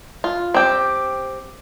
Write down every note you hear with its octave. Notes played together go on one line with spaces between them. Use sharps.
F4
C4 G4